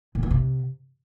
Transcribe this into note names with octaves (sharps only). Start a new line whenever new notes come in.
A#2
E3
C3